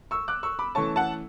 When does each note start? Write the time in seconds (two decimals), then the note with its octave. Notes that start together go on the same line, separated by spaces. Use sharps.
0.11 C#6 E6
0.28 D6 F#6
0.43 C#6 E6
0.59 B5 D6
0.75 E3 A3 C#4 A5 C#6
0.96 F#5 A5